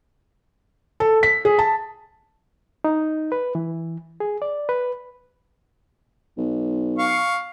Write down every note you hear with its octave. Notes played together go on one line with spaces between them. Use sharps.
A4
B6
G#4
A5
D#4
B4
E3
G#4
D5
B4
B1
F5 C#6